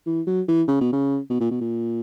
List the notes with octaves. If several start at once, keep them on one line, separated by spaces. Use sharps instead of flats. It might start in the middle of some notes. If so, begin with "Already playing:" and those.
E3
F#3
E3
C#3
B2
C#3
B2
A#2
B2
A#2